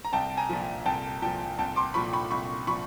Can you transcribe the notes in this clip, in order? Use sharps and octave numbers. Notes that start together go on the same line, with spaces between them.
A#5
C2 G5 A5
G#5 A#5
A#2 F3
C2 G5 A5
A#2 F3 G5 A5
C2 G5 A5
C6 D6
A#2 F3 B5 C#6
B5 C#6
C2 B5 C#6
A#2 F3 B5 C#6